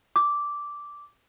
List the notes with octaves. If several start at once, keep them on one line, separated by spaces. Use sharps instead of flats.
D6